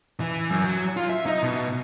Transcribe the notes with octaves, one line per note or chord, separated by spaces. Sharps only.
E3
F#2
F#3
F4
E5
D#4
B2